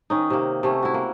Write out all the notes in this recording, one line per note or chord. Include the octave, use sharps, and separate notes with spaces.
D#3 C#4 D#4
C3 A#3
C3 A3 C#4
E4 F#4
A#3